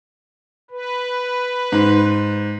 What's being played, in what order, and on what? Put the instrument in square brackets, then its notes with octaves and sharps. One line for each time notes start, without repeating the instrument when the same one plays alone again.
[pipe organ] B4
[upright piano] G#2